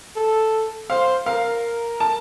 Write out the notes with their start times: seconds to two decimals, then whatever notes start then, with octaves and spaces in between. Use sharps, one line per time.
0.16 A4
0.90 C5 F5
1.26 A#4 F5
2.00 A5